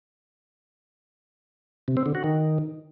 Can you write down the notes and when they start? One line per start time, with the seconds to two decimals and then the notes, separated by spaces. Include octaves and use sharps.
1.88 C3
1.97 C4
2.06 D3
2.15 F#4
2.24 D#3